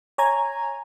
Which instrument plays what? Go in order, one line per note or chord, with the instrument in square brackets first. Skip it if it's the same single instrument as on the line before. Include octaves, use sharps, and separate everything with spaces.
[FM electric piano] C#5 G#5 A#5 G#6